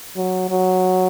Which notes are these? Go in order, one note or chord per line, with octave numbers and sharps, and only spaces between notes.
F#3
F#3